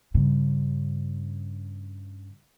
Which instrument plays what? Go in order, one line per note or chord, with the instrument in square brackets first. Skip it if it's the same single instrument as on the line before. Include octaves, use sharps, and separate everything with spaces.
[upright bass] G2 C#3